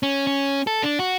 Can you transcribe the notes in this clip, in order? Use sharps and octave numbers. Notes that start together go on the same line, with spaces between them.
C#4
C#4
A4
D4
F#4